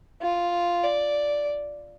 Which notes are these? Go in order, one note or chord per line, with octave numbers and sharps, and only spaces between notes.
F4
D5